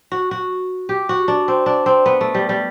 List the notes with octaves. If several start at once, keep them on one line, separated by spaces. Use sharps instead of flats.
F#4
F#4
G4
F#4
D4
C4
D4
C4
B3
A3
G3
G3